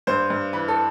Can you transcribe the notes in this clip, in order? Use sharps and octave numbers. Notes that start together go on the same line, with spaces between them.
G2 C5
G2
E3 B4
A4